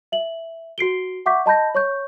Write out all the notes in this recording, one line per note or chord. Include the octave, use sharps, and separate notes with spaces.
E5 F#7
F#4 C7 D7 G7
E5 F#5 C#6 D6 G6 B6
D#5 A5 B5 G6 A#6
C#5 C#6 G6